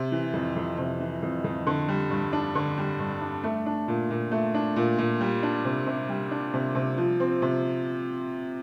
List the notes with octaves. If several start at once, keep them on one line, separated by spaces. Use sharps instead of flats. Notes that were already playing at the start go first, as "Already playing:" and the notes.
Already playing: C3
E3
F2
F2
C3
E3
F2
F2
D3
G3
G2
D4
D3
G3
G2
D4
A3
D4
A#2
A#2
A3
D4
A#2
A#2
G3
D4
C3
C3
G3
D4
C3
C3
F3
C4
C3